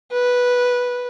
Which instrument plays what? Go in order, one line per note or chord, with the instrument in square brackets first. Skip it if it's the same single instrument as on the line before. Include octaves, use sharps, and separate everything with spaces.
[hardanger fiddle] B4